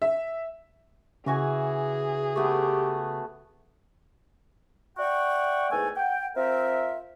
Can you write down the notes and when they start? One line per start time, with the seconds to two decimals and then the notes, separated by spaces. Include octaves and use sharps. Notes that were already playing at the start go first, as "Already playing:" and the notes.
0.02 E5
1.26 C#3 E3 F#4 G#4 G#5
2.36 A3 B3 F#4 G4
4.98 D5 E5 F#5 G5 C#6
5.71 E2 G#2 A3 G#5
5.96 F#5 G5
6.36 C4 F4 A#4 E5